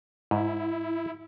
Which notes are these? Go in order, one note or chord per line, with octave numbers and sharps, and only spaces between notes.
G#2 E4